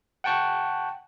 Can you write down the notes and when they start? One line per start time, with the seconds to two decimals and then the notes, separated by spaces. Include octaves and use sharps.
0.24 F#5 G5 A5 C#6 F#6